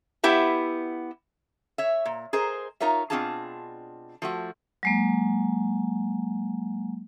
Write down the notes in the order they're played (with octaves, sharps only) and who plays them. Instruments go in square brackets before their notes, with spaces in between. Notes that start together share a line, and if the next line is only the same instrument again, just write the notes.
[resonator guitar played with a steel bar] B3 E4 G4 E5
C#5 E5
A#2
G#4 A#4 C5 D#5
D#4 F4 A#4 C#5 E5
B2 C4 D4 F4 G#4 A5
F3 A3 F#4
[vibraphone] F#3 G#3 A#3